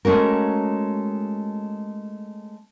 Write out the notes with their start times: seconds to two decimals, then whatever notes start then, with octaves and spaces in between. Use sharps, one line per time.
0.05 G#3 A3 C#4 F#4 A#4